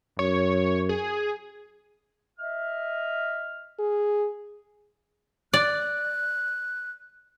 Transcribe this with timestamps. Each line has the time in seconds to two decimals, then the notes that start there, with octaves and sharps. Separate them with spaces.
0.19 F#2 C#5
0.89 G#4
2.39 D#5 E5 F6
3.79 G#4
5.54 D5 F#6